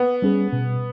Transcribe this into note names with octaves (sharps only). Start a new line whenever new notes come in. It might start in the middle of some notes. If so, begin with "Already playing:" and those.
Already playing: B3
G3 C#4 G#4 B4
B2